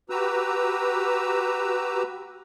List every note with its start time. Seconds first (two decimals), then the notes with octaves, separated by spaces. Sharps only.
0.10 F#4 G4 B4 A#5 E6